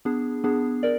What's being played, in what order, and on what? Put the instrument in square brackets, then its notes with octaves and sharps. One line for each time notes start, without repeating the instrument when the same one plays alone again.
[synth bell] B3 D4 G#4
B3 D4 G#4
A#4 D5